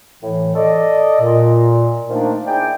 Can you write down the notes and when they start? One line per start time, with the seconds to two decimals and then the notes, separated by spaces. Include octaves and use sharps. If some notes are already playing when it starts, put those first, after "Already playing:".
0.22 A2 E3
0.55 A4 D5 D#5
1.20 A#2
2.08 D#3 F3 A3 A#3 D4 D#4
2.46 E4 G#4 D5 G5